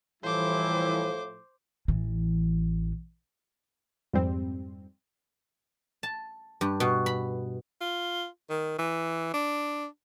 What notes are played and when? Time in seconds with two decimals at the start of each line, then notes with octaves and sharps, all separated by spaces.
0.23 A2 E3 F3 G3 E4 C5 D6
1.88 A1 E3
4.13 F2 G#2 G3 C4
6.03 A5
6.61 G2
6.80 B2
7.06 B5
7.81 F4
8.50 D#3
8.79 E3
9.33 D4